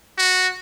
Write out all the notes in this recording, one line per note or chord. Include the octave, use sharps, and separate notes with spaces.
F#4